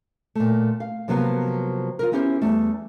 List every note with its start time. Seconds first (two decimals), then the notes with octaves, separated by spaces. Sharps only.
0.35 A#2 A3
0.80 F5
1.08 C3 F3 F#3 A#3 B3
1.99 F4 A#4
2.12 B3 C#4 E4 G4 A4 C5
2.41 E2 G3 A3